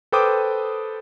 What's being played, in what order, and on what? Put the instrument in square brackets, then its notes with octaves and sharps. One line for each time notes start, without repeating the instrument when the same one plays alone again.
[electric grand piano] A4 B4 C5 G5 D6 D#6